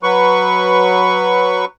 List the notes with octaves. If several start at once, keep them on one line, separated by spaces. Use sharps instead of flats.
F#3 B4 C#6